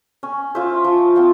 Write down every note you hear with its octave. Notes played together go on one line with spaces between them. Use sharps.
C#4
F4 C5 E5
F3
C4 F4